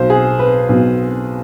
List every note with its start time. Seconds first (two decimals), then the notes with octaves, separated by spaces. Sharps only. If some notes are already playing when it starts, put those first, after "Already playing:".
Already playing: B1 B2 C5
0.10 G#4
0.39 B4
0.69 B1 B2